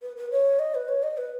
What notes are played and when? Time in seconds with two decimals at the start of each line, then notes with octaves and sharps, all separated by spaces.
0.02 B4
0.16 B4
0.31 C#5
0.59 D#5
0.75 B4
0.89 C#5
1.03 D#5
1.17 B4